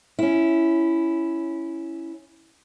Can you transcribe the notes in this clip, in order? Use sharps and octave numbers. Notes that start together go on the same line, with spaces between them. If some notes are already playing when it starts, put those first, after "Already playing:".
C#4 E4